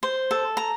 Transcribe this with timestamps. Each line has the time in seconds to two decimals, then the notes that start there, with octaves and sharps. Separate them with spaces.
0.03 C5
0.31 A4
0.57 A#5